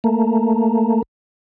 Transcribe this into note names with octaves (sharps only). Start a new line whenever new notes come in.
A3 A#3